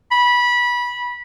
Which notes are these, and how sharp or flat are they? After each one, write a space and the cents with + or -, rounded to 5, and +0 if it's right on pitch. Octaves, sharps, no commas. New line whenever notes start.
B5 -20